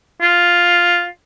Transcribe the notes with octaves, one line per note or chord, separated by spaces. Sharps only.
F4